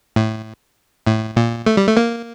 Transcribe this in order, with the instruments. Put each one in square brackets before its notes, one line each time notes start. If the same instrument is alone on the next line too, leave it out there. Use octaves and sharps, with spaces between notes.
[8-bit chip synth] A2
A2
A#2
A3
G3
A3
A#3